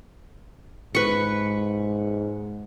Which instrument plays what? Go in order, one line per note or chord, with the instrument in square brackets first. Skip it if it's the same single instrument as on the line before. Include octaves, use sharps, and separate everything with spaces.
[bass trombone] G#2 [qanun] B4 C#6